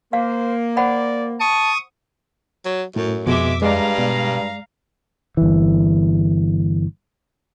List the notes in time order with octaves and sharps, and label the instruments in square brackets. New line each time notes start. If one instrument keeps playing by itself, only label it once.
[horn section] A#3 [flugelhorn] C5 [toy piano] F5
[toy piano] C5 F#5 B5 [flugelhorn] D5
[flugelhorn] A5 [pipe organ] C#6 D#6
[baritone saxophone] F#3
[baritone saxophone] F#2 [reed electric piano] A2
[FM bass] F2 [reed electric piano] B2 [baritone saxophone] G#3 [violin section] E5 D6
[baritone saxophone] G2 [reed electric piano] G#3 D5 [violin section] F5 A#5
[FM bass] B2
[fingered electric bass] G1 E3